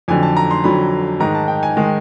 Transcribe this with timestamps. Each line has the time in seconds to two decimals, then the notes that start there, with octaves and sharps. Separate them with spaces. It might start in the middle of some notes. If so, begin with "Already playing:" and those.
0.08 F2 D3 F#3 G#5
0.23 A5
0.37 A#5
0.51 C6
0.64 F2 D3 F#3 B5
1.20 G#2 D#3 G#3 A#5
1.35 A5
1.48 G5
1.63 G#5
1.77 D#3 G#3